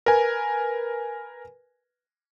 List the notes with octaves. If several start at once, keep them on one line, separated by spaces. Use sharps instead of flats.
A#4 B4 G#5